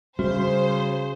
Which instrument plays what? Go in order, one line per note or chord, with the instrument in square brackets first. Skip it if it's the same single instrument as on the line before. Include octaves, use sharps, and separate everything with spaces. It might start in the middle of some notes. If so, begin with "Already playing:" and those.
[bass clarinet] C#3 [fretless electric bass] G3 C#4 [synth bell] F#4 [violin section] C5